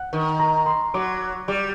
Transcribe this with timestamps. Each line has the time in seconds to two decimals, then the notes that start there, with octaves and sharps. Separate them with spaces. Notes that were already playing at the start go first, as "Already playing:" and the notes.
Already playing: F#5
0.13 D#3
0.39 A#5
0.66 C6
0.94 F#3 D6
1.48 G3 D6